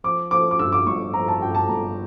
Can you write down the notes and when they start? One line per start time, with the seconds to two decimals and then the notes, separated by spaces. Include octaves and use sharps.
0.04 F3 D6
0.31 F3 D6
0.51 D6
0.59 G2 E6
0.72 D6
0.86 G1 C#6
1.14 F3 A#5
1.28 A5
1.41 G2 G5
1.55 A5
1.68 G1 A#5